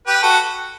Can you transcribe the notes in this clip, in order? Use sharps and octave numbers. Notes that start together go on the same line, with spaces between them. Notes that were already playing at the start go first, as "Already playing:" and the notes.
G4 B4
F#4 A4